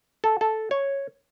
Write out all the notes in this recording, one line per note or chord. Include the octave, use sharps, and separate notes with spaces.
A4
A4
C#5